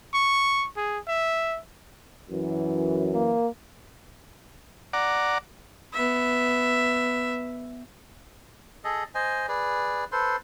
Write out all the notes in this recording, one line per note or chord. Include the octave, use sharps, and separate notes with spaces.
C#6
G#4
E5
F#2 E3
A#3
D5 F#5 A#5 D6
B3 E5
G#4 A4 D#5
C5 D#5 G#5
G#4 B4 D5
A4 B4 C5 C6